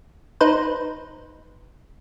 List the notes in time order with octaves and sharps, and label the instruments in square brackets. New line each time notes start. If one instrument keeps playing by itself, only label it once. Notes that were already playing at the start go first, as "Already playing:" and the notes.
[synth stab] D#4 B4 C5